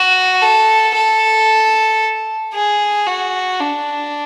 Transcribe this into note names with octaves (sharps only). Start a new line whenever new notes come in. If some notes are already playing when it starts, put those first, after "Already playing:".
Already playing: F#4
A4
A4
G#4
F#4
D4